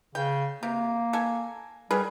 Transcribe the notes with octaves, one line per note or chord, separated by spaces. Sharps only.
C#3 G5
C3 A#3
A4 G#5
G3 G#4 A#4 B4